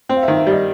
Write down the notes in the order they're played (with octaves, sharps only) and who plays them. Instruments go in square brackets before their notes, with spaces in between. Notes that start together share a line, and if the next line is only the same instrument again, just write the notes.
[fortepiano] C4 [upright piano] G5
[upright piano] F5
E5
[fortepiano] D#3
[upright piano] E5
[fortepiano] G3 [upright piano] D#5